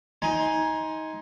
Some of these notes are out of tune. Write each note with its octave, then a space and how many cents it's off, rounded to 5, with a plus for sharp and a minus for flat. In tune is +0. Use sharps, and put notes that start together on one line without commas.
D#4 +20 G#5 +0 C6 +0